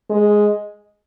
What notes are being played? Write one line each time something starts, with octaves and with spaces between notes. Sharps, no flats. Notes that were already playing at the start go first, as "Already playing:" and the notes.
G#3